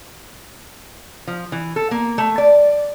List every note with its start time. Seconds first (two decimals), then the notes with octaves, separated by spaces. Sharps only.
1.27 F3
1.52 E3
1.76 A4
1.91 A#3
2.18 A3
2.38 D5